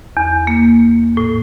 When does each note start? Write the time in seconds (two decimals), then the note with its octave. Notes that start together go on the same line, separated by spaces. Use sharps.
0.17 E2
0.47 A#3
1.17 A2